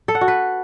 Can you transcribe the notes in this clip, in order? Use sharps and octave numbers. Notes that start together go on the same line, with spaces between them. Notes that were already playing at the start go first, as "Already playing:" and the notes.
A4
F#5
F#4
B4